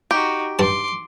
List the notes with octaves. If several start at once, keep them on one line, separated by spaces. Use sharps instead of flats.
D#4 F#4 G4
G2 A5 C6 D6